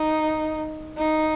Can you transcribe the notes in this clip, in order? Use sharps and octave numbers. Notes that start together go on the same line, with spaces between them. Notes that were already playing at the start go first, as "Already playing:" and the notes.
Already playing: D#4
D#4